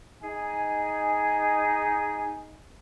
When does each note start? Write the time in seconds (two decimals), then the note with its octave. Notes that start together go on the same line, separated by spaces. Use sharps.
0.22 D#4 G#4 G#5